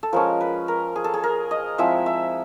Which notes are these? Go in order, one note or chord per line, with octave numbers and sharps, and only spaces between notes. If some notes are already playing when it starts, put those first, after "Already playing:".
A4
F3 G#3 C#4 A#4
B4
A#4
G#4
A4
G#4
A#4
D#5
F3 G#3 C4 E4 E5
E5